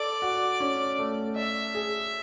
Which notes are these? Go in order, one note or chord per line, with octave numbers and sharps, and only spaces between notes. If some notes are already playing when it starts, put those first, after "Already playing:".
Already playing: A4 D5
F#4
C#4
A3
D5 E5
G#4